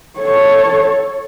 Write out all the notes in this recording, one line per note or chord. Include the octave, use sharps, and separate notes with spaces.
A4 C#5